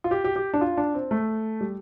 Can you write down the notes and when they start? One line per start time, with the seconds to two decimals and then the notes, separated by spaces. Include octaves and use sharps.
0.04 F4
0.11 G4
0.24 G4
0.36 G4
0.54 D4
0.61 F4
0.77 D4
0.94 C4
1.11 A3
1.61 G3